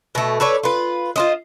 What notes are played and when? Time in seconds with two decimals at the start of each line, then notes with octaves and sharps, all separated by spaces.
0.15 B2 A3
0.40 A4 B4 C#5 D5
0.63 F4 B4
1.16 F4 C5 D#5